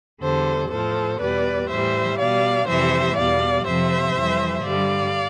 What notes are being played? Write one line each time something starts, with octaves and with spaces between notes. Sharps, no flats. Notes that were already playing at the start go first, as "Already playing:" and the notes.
E2 D3 G3 A4 C5
A2 F3 A4 C5
E2 B2 G3 B4 D5
A2 E3 G3 C5 E5
B2 G3 D5 F5
F2 C3 E3 G3 C5 E5
E2 B2 G3 D5 F5
F2 C3 F3 C5 E5
F2 E3 G3
G2 D3 G3 D5 F5